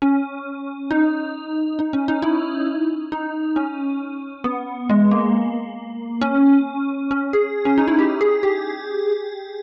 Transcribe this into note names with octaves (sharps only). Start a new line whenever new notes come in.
C#4
D#4
D#4
C#4
D#4
E4
D#4
C#4
B3
G#3
A#3
C#4
C#4
G#4
C#4
D#4
E4
G4
G#4
G4